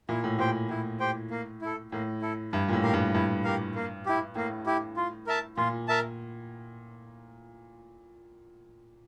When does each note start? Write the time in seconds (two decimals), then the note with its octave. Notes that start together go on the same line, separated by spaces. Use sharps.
0.09 A#2 E4
0.24 A2
0.39 A#2 G4 C5 G5
0.69 A2 E4
1.00 G4 C5 G5
1.31 A#3
1.62 E4 A4
1.92 A2 A#3
2.22 E4 A4
2.52 G2 E4
2.68 A#2
2.73 A2
2.83 G4 A#4 F5
2.93 G2
3.14 G2 E4
3.44 G4 A#4 F5
3.75 A#3
4.06 E4 G4
4.35 A2 A#3
4.66 E4 G4
4.97 F4
5.27 A#4 E5 A5
5.57 A#2 F4
5.88 A#4 E5 A5